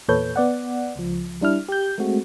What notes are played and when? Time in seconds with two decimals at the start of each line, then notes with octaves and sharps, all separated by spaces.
0.08 E2 A#2 A4 B4 C#5 G6
0.36 B3 D5 F#5
0.96 C#2 F3
1.41 G3 D4 E4 F6
1.69 G4 G6
1.98 G#3 A3 C4 F#4